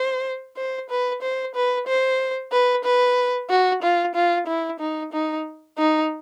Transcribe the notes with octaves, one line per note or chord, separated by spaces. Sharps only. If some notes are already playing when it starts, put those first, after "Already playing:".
Already playing: C5
C5
B4
C5
B4
C5
B4
B4
F#4
F4
F4
E4
D#4
D#4
D#4